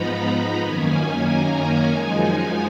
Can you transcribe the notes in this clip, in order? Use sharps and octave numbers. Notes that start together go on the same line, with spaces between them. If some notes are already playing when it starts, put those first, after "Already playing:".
Already playing: G#2 F3 B3 D#4 A#5 B5
A#5
F#2 D#3 A#3 C#4 G#5
G#5
A#5
F#2 F3 G#3 D#4 G#5